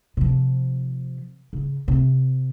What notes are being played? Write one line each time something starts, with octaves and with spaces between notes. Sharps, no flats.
C3 F3
C#3
C3 C4